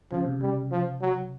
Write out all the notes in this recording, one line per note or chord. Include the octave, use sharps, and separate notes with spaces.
C#3 F3
C3
C#3 G3
F3
F#3